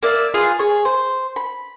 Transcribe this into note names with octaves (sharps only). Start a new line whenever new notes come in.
A#3 D5 E5
F4 G#4 B4 C6
G#4 C#5
C5
B5